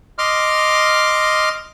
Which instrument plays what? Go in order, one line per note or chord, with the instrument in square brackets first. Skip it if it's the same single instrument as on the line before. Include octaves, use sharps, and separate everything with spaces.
[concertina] D#5 C6 D6 F6